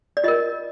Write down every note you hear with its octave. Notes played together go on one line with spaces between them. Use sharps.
D5
F4 A#4 D#5